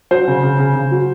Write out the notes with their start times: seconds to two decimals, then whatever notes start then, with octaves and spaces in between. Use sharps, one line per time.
0.11 F#3 C5
0.28 C#3
0.43 C#3
0.59 C#3
0.76 C#3
0.91 F#3